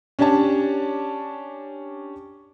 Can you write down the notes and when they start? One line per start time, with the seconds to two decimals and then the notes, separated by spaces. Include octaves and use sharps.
0.19 C#4 D4 G4 C#5 A5